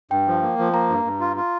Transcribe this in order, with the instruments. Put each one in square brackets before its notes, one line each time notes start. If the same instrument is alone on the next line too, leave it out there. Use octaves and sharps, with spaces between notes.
[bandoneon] G2 [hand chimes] G5
[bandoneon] F3
A#3
F3
[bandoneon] A#3 [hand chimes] A#5
[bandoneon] G2
G2
F4
F4